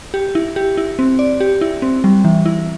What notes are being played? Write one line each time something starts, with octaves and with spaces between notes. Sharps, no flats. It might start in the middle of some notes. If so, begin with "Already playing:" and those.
G4
E4
G4
E4
C4
D5
G4
E4
C4
G3
E3
E4